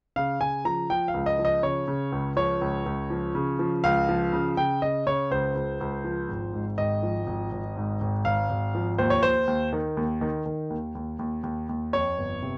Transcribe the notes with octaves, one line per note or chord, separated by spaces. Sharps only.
C#3 F5
C#3 G#5
F3 A#5
F3 G5
F5
C#2
D#5
F3
D#5
C#3 C#5
C#3
C#2
F3 C#5
C#2
C#2
F3
C#3
F3
C#2 F5
F3
C#3
C#3 G5
C#3 D#5
C#3 C#5
C#2 C5
C#2
C#2
F3
G#1
G#2
G#1 D#5
F3
G#1
G#1
G#2
G#1
G#1 F5
G#1
F3
D#2 C5
C#5
D#2 C5
D#2
D#3
D#2
D#3
D#3
D#2
D#2
D#2
D#2
D#2
F2 C#5
G1
C3